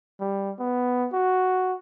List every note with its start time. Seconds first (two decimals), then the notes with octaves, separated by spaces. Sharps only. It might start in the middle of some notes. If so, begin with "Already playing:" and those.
0.20 G3
0.59 B3
1.13 F#4